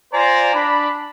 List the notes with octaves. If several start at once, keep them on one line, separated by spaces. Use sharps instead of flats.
F4 C5 D5 G#5 A#5
D4 B5